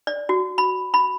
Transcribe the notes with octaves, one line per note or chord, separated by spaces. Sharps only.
D5
F#4
B5
B5